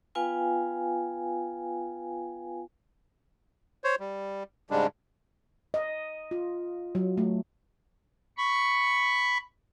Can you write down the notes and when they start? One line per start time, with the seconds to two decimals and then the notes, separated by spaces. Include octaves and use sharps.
0.15 B3 F4 B4 F5 G5 G#5
3.84 C5 C#5
4.00 G3
4.70 G#2 C#3 G3 G#3 D4
5.74 D#5
6.31 F4
6.95 F#3
7.17 A3
8.37 B5 C#6